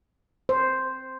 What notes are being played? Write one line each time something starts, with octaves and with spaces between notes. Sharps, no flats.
C5